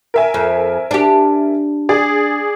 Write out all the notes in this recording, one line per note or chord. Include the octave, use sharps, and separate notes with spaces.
A#4 E5 G#5
F2
D4 G4
G#4 D5